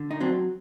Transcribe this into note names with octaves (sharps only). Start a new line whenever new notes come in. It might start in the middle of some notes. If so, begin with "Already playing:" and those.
Already playing: D3
D#4
F#3 C4 D4